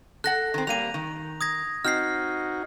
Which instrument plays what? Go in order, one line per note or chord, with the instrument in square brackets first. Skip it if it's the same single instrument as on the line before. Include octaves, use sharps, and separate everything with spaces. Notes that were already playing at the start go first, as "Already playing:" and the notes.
[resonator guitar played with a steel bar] A4 F#5 [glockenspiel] F#6 A#6
[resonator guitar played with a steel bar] D#3 C4
[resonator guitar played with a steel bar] G3 A#3 G4 [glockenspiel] D#7 F7
[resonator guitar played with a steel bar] D#3
[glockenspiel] D#6 G#6 A#6
[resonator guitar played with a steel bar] C4 [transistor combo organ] D#4 F#4 [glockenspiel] F6 G6 C7